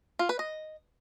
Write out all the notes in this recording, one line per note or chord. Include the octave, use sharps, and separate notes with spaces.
F4
B4
D#5